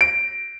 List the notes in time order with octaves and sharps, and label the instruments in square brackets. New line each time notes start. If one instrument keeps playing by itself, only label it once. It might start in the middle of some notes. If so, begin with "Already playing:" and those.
[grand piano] D7